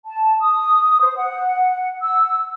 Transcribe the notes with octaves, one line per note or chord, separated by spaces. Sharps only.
A5
D#6
C5
F#5
E6